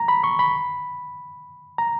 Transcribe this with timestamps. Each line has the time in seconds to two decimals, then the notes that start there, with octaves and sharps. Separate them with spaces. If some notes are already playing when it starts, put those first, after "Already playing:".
Already playing: A#5
0.08 B5
0.24 C#6
0.39 B5
1.78 A#5